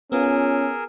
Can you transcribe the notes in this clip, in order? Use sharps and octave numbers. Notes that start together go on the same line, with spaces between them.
B3 C#4 F4 G#4 A#4 E6